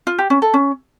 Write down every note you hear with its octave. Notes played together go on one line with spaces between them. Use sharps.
F4
G4
C#4
A4
C#4